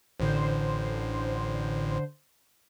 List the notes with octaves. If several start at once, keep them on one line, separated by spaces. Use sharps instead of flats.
A1 A2 D3 C5